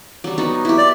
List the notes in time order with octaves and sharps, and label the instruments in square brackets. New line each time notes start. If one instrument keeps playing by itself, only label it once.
[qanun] F#3 G3
B3 D#4 F#4
E4 G4
[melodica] D5